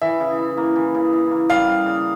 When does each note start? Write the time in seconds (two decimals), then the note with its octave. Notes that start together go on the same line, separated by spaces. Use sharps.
0.02 E3 E5
0.20 C#3
0.39 E4
0.57 A#3
0.76 E3
0.94 C#3
1.13 E4
1.31 A#3
1.50 G3 F5
1.68 C#3
1.86 C#3